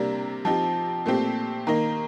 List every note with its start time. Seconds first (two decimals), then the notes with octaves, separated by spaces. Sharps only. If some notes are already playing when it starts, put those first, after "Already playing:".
Already playing: C3 G3 A#3 D4 A#5
0.45 F3 C4 D#4 G4 A5
1.06 A#2 A3 C4 G4
1.67 D#3 A#3 D#4 A#5